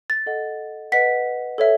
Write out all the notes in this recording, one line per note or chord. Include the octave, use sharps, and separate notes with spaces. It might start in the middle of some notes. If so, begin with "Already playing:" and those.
A6
A4 D#5 F#5
B4 D#5 F#5 B6
A4 C#5 E5